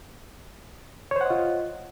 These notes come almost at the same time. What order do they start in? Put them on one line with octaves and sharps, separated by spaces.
C#5 C5 F#5 D#5 F4